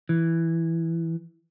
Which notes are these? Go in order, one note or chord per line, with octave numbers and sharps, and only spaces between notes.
E3